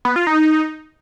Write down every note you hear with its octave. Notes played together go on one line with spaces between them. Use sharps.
B3
F4
D#4